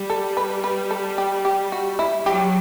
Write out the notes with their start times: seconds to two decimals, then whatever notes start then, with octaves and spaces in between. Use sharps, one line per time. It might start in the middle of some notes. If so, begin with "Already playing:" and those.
Already playing: G3
0.10 A4
0.37 B4
0.64 B4
0.91 A4
1.18 G4
1.45 G4
1.72 F#4
1.99 E4
2.25 F#3 G4